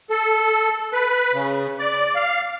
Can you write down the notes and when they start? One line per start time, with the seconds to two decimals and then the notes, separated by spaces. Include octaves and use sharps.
0.10 A4
0.93 B4
1.34 C#3
1.79 D5
2.15 F5